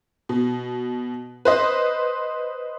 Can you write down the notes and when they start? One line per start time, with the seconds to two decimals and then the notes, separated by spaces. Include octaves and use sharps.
0.29 B2
1.45 B4 C5 D#5